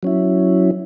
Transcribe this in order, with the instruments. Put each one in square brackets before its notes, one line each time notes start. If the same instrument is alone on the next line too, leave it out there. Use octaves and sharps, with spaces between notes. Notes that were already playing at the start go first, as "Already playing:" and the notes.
[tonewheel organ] F#3 C#4 E4